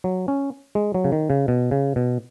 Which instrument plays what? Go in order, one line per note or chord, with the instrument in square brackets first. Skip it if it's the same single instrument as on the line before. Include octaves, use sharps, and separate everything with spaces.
[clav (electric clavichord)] F#3
C#4
G#3
F#3
C#3
D#3
C#3
B2
C#3
B2